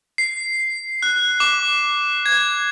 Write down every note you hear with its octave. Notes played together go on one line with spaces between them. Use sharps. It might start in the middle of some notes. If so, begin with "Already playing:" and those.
C7
F#6
D6
G#6